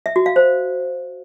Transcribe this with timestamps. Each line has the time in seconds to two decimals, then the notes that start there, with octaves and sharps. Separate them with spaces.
0.06 E5
0.16 F#4
0.26 F5
0.36 C5